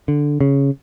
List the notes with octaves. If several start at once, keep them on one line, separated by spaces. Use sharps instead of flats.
D3
C#3